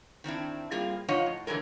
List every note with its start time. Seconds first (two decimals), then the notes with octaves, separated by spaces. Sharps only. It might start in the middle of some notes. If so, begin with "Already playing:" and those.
0.24 D#3 C4 D4 E4
0.71 G3 A#3 C4 F4 G#4
1.08 F3 D#4 F4 C#5 D#5 F#5
1.26 A2
1.47 D3 E3 F#3 G#3 A#4